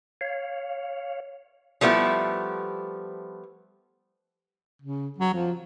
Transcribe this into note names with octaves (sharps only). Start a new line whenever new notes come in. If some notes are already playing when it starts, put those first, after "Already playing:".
C#5 F5
F3 G3 A3 B3 E4
C#3
F#3
F3